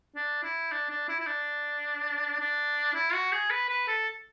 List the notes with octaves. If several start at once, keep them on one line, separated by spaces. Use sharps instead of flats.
D4
E4
D4
D4
E4
E4
D4
D4
E4
F#4
G#4
B4
B4
A4